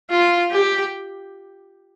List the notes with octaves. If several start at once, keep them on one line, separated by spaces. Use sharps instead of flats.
F4
G4